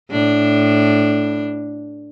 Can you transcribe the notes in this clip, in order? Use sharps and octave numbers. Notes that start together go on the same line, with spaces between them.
A2 D4